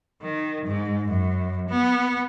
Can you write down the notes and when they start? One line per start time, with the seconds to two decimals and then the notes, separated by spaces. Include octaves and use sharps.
0.22 D#3
0.66 G#2
1.09 F#2
1.69 B3